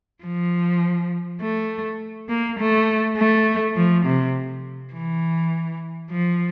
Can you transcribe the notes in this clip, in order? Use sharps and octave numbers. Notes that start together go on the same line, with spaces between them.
F3
A3
A#3
A3
A3
F3
C3
E3
F3